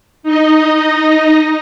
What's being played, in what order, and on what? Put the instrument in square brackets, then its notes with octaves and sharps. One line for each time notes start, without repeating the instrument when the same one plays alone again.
[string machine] D#4 D#5